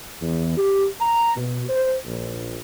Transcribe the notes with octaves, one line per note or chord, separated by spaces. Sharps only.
E2
G4
A#5
B2
C5
A#1